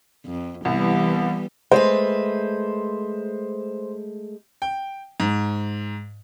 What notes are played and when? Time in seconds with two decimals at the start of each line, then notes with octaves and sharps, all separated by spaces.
0.25 F2
0.65 C2 E3 G3 B3
1.71 G#3 A3 B4 C5
4.62 G5
5.20 G#2